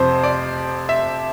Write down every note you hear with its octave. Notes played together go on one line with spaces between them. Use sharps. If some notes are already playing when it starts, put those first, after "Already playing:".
Already playing: F2 C3 F3 C5
D5
E5